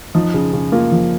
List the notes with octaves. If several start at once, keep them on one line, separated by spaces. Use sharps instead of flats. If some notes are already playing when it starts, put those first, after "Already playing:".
F3 D#4
C#3
C#3
A#3 F4
F3